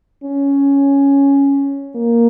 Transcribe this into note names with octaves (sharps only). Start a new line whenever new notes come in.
C#4
A#3